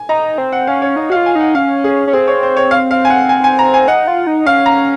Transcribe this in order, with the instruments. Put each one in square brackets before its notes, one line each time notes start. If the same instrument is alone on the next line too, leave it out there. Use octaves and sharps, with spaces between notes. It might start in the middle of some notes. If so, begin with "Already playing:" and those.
Already playing: [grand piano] G#5
[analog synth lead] D#4 [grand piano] A#5
[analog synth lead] C4
[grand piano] F#5
[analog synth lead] C#4 [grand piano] F5
[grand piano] C#5
[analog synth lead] D#4 [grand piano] D#5
[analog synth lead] F#4 [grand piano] F5
[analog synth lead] F4
[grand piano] G#5
[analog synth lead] D#4 [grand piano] F#5
[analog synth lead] C#4 [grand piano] F5
[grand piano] G#4
[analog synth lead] C#4
[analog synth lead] C4 [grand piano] G#4
[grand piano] C#5
C5
C#5
F5
F5
G#5
F#5
G#5
G#5
A#5
G#5
[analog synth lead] D#4 [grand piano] F#5
[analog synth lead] F4
D#4
[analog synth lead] C#4 [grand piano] F5
[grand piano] A#5